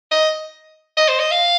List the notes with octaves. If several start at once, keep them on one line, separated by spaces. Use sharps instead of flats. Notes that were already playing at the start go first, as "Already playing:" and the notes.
D#5
D#5
C5
D#5
F5